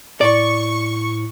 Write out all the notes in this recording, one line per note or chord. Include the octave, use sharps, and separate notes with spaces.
A2 D5 C#6